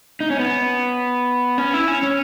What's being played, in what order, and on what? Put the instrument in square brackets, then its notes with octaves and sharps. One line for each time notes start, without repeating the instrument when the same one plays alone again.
[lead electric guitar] D#4
C#4
B3
C#4
E4
C#4
C#4